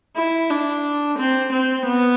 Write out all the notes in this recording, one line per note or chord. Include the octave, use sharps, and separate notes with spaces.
E4
D4
C4
C4
B3